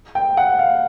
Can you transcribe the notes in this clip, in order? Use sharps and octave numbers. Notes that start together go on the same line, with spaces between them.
G5
F#5
F5